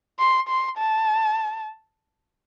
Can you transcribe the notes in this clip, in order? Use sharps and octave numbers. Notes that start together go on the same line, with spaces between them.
C6
C6
A5